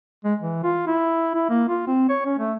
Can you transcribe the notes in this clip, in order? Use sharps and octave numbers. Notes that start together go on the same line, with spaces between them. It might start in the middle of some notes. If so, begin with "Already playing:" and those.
G#3
E3
F4
E4
E4
A#3
F4
C4
C#5
C#4
A3